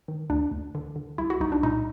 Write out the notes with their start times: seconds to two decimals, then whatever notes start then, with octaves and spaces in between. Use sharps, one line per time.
0.08 D#3
0.30 D2 D4
0.51 D2
0.75 D3
0.96 D3
1.18 C2 E4
1.30 F#4
1.40 C2 D#4
1.52 D4
1.63 A#2 D#4